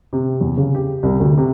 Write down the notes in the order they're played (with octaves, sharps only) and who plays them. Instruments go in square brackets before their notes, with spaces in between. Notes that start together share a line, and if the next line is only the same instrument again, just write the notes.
[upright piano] C3
E2
C#3
G4
C2
D2
C3